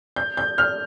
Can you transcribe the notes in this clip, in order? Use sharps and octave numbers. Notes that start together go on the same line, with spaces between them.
G6
G6
F6